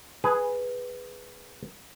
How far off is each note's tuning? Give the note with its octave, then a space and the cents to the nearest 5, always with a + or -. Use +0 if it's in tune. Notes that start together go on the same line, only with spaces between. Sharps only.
G#4 +0 B4 +0